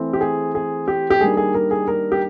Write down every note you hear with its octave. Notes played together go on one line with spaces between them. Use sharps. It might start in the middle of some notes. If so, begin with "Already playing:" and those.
Already playing: E3 A3 C4
G4
G#4
G#4
G4
G4
D#3 G3 A#3 D4 G#4
G#4
A#4
G#4
A#4
G4